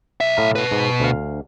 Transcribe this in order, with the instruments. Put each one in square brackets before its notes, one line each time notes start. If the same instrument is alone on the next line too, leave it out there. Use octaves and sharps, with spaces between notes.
[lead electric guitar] B1 E5
[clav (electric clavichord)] A2 F5 A#5
[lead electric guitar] B2 B4
[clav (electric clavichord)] G#2
D2 F5